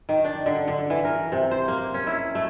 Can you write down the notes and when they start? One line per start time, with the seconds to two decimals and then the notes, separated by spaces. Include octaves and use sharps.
0.09 D#3
0.24 D4
0.46 D3
0.68 D3
0.90 E3
1.05 A#4
1.32 C3
1.51 C5
1.68 A#3
1.94 C#4
2.07 E4
2.35 A3